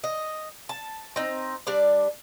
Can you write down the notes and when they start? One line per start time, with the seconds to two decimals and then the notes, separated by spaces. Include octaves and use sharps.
0.04 D#5
0.69 A5
1.16 C4 D#4
1.67 G3 D4 D5